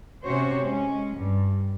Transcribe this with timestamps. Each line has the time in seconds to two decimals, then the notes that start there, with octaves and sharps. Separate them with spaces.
0.25 C3 C#4 F#4 C5 C#5
0.61 G#3 C#4
1.15 G2